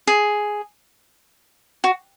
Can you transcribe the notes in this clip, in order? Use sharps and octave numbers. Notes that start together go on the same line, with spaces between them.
G#4
F#4